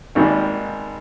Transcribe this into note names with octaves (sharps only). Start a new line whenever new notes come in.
G#1 G#2 D#3 G3 A#3